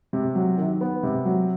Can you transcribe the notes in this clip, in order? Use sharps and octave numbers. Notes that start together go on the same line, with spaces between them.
C3
F#3
D#3
B3
C3
F#3